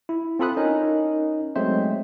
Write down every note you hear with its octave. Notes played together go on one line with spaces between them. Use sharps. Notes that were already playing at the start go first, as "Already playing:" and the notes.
E4
C4 F4 A4 B5 D#6 F#6
C#4 D#4 A#4
F#3 G#3 A3 C4 C5 E5